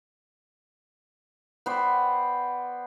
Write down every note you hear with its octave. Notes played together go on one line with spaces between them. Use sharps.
B3 C5 D5 G5